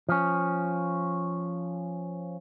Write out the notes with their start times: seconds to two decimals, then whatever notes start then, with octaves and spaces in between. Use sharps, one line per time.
0.09 F3 C#4